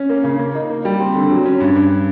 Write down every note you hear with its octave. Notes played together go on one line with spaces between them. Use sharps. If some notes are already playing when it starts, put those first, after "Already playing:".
Already playing: C#4
A#3
C#3
A#3
D#4
A#3
G3
C4
D3
F#3
C#4
G2
G2